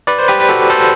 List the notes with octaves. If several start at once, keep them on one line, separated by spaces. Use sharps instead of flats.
B4 D5
C5
G4 B4
B4
F#4 A4
A4 C5